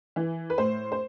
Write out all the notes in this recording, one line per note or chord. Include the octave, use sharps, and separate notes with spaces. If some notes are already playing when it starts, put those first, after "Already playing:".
E3
B4
A2 C5
C5